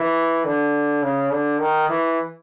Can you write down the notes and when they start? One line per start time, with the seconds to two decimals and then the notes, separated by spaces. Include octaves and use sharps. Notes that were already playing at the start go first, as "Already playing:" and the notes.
Already playing: E3
0.45 D3
1.03 C#3
1.31 D3
1.60 D#3
1.89 E3